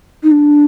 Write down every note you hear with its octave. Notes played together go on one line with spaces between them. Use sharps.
D#4
D4